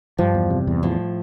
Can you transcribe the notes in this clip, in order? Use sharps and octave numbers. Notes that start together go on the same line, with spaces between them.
G2 F3
E2
C3
E2
A2 F3